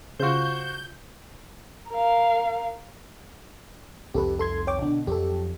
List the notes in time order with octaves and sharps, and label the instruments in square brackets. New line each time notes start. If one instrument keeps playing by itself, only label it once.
[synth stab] C#3 F4 [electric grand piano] F#4 C5 [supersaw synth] G6
[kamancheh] A#4 F5
[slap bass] C2 F2 D#3 [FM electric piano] G4 A4 B4
[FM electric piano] A4 C6 G#6
C#5 G5 D6
[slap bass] B2 D3 [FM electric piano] D4
[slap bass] F2 F3 F#3 [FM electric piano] G4 A4